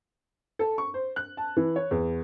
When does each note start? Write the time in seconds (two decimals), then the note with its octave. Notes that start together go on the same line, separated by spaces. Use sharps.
0.59 A4
0.78 C#6
0.94 C5
1.16 F#6
1.37 A5
1.57 E3
1.76 C#5
1.91 E2